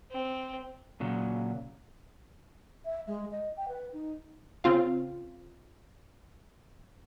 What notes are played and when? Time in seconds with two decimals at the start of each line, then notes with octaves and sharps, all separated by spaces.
0.11 C4
1.00 A#2 C#3 F#3
2.85 E5
3.07 G#3
3.31 D#5
3.57 G5
3.68 B4
3.93 D#4
4.64 C#3 C4 F4 F5